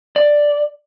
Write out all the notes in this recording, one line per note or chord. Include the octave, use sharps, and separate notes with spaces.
D5